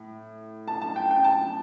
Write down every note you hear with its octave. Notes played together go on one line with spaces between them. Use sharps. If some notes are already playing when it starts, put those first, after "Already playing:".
Already playing: A2
A5
A5
G5
G5
A5